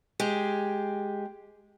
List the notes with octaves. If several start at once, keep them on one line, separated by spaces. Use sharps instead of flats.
G#3 G4 G#4